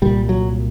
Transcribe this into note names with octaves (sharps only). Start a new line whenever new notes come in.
C2 A#2 G3
F#3